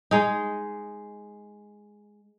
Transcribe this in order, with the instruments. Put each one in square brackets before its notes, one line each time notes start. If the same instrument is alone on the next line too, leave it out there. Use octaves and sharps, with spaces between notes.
[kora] G#3 D#4